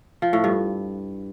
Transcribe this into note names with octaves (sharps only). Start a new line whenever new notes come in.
F3
A2
G2